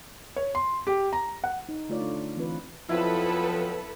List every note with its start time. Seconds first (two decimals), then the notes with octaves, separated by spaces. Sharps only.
0.36 C#5
0.55 C6
0.87 G4
1.13 A#5
1.44 F#5
1.69 D#4
1.89 D3 A3 F4 C#5 D5
2.01 D4
2.36 E3 C4 F4 B4
2.89 F2 F3 F#3 B3 E4 A4 B4